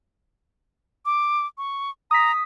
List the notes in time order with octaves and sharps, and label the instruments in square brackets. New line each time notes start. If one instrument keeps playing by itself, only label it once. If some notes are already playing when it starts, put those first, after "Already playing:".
[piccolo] D6
C#6
[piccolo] A#5 [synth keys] D#6 B6